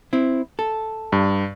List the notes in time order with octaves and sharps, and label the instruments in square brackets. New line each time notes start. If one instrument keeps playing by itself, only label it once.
[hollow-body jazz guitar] C4 E4
A4
[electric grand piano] G2